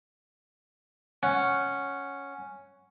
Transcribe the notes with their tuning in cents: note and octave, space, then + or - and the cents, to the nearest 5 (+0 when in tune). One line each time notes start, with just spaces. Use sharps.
C#4 +0 F#5 +0